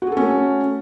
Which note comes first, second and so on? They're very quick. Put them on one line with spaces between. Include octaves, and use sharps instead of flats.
F#4 G#4 A4 C#4 A3